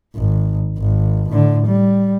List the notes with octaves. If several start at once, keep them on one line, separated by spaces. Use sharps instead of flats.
G#1
G#1
A2 D3
G3